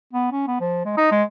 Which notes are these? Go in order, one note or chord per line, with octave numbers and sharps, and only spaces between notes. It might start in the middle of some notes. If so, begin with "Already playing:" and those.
B3
C#4
B3
F3
G#3
D#4
G#3